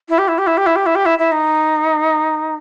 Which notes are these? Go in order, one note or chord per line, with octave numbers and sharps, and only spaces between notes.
E4
G4
E4
G4
E4
G4
E4
G4
E4
G4
E4
E4
D#4